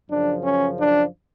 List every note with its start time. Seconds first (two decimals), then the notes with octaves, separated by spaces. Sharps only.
0.10 F#2 C#3 F3 D4
0.44 C#4
0.78 D4